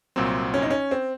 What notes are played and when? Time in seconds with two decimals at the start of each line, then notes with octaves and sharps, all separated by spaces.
0.16 C2 A#2 F#3 C4
0.54 C#4
0.62 D#4
0.70 C#4
0.91 C4